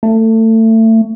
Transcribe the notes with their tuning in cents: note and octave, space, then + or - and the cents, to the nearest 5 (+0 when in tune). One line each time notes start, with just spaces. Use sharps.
A3 +25